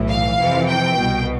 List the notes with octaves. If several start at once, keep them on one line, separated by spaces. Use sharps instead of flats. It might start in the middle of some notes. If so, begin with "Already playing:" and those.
Already playing: B1 A2 E3
F5
F2 C3 E3
G5
C2 B2